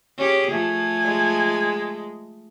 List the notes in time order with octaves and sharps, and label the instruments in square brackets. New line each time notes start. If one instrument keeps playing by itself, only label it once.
[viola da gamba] C#4 G4 G#4
[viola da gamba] F3 A3 [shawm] G#5
[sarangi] G#3